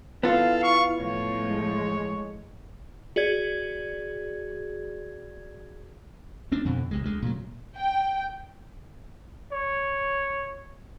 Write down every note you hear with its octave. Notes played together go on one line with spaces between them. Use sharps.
B3 E4 F4 A4 F5
C#6
A2 F3 C#5
G#3
F#4 G#4 D5 G#6
D2 C4 D4
F2 B2 D3
C2 C3 G#3
D2 G#3
A#2 C#3 F#3
G5
C#5